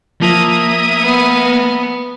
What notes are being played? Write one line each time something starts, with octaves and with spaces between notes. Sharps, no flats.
F3 A#3 E5 D#6
B3